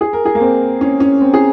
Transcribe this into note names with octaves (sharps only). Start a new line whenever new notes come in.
G#4
A#4
G#4
A#3
C4
C#4
C#4
C4
G#4